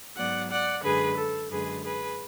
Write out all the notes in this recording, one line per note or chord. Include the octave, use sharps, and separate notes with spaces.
G#2 F#3 B3 D5 F#5
D5 F#5
F#2 D3 G#3 G#4 B4
A4
F#2 D3 G#3 G#4 B4
G#4 B4